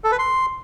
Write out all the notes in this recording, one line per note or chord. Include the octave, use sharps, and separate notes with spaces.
A4
B4
C6